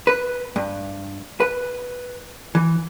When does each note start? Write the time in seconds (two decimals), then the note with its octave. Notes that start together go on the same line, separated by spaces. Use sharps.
0.07 B4
0.56 G2
1.40 B4
2.55 E3